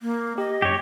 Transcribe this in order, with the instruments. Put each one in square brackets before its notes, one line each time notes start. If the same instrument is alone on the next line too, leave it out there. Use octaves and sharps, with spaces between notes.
[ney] A#3
[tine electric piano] G4 [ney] D#5
[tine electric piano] F#2 [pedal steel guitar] G4 C#5